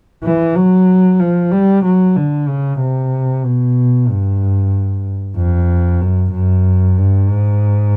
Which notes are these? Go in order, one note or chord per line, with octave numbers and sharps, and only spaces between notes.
E3
F#3
F3
G3
F#3
D3
C#3
C3
B2
G2
F2
F#2
F#2
G2
G#2